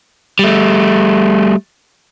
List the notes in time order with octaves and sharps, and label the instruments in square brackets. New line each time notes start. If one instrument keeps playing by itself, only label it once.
[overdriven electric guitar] G3 A3